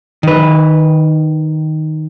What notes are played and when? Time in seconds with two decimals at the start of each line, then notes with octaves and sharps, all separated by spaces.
0.23 D#3 B4